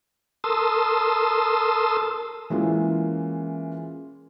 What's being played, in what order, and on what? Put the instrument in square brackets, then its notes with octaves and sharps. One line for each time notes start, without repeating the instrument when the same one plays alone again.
[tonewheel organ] A4 A#4 A5 C6 D#6 E6
[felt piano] E3 G#3 A#3 C#4 F4